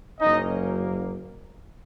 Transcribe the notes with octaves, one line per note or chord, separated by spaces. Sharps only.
F#1 F#2 F#3 A#3 C#4 D#4 D#5